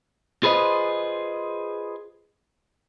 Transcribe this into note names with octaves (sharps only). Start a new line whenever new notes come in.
F4 G#4 B4 C5 D#5